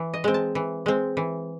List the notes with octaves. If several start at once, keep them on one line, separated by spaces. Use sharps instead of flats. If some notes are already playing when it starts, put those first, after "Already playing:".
Already playing: E3
D#5
G#3 C4
A5
E3
G#3 C4
E3